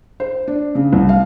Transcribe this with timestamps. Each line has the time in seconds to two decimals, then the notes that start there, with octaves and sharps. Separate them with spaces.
0.20 C5
0.48 D4
0.75 C#3
0.93 C2
1.09 F5